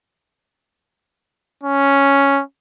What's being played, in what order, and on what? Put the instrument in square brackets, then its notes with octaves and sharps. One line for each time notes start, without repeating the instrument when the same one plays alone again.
[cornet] C#4